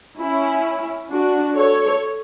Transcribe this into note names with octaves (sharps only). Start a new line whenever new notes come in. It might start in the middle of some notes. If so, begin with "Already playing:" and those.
C#4 E4
D4 F#4
A4 C#5